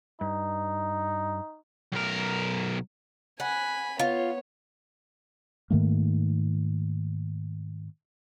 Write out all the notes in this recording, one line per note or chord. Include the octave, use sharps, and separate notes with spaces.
G2 D#4
B1 A#4
F#5 G#5 B5
B3 F4 C#5
G#2 D#3 A3 A#3